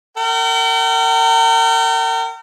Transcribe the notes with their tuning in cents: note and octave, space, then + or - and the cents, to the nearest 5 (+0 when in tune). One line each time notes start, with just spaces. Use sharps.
A#4 -40 G5 -45